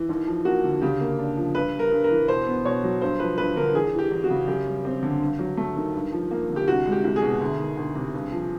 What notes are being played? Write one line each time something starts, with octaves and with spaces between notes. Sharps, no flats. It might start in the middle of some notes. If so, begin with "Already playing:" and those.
Already playing: E3
D#2
F3
A#3 F#4
D3
C#3 G4
A#3
D4
F3
G2 B4
G3
A#4
G2
A#4
E3
B2 C5
B3
B2 C#5
F#3
G2 C5
F3 B4
G2 B4
D3 A#4
E2 G#4
E3
G4
E2
F#4
C#3
F#2 G4
G3
C4
D3
G2
F#3
A3
D#3
G2
F3
A#3
D3
G4
C2 F#4
G#3
G4
C2
G#4
B2
D2
D#3
D2
C3
G2
F3